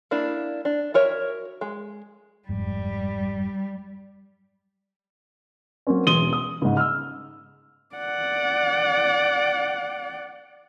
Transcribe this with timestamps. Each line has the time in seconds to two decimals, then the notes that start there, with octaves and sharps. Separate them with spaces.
0.11 A#3 D4 E4
0.65 D4
0.94 F#4 A#4 C#5 E5
1.61 G#3
2.49 F#1 F2 G#2 G3
5.87 F#3 A#3 C4 C#4
6.07 E1 E2 C6 D#6 D#7 G7
6.33 D#6
6.62 G#2 C#3
6.77 E6 F6
7.96 D5 F#5